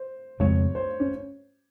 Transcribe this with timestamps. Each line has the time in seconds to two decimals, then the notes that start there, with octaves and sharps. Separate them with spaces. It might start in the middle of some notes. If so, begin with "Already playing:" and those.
Already playing: C5
0.40 F2 C#3 G#3 C4 C#5
0.75 C5
1.00 C#4